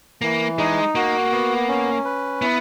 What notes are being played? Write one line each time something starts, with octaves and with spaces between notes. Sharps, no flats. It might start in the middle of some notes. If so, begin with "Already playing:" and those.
E3 A#3
G#3 D#4
A#3 F#4
B3
C#4
B4
B3 E4